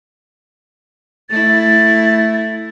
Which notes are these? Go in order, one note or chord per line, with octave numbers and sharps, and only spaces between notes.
A3 E4 A6